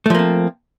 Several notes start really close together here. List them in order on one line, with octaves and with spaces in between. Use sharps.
A3 F3 A#3 C4